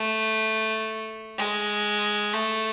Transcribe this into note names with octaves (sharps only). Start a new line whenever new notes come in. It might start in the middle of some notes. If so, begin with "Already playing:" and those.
Already playing: A3
G#3
A3